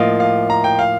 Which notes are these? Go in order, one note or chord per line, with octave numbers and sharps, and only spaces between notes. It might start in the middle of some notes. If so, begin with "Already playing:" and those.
Already playing: A2 F3 A#3 D#5 F5
F5
A#5
G5
F5